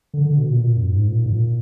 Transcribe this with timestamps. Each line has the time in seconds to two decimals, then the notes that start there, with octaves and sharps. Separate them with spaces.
0.14 D3
0.26 D3
0.38 B2
0.49 A#2
0.57 B2
0.61 A#2
0.76 F#2
0.92 G#2
1.08 A#2
1.26 G#2
1.31 A#2